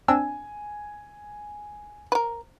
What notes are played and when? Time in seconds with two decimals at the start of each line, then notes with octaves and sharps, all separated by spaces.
0.08 C4 D4 G#5 E6
2.12 A#4 B4